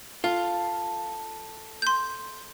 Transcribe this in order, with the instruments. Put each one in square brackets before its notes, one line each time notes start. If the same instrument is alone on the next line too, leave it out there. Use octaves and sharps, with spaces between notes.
[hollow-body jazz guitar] F4 [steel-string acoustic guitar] A4
[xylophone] C6 G6